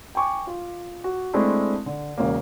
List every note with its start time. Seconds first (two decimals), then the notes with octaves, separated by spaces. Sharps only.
0.15 G5 G#5 C#6 D6
0.47 F4
1.04 F#4
1.34 G#3 A3 C4 D4 E4
1.86 D3
2.18 E1 C#3 A#3